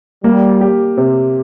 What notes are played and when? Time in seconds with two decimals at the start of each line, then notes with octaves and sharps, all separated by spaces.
0.24 G3 A#3
0.61 G4
0.97 C3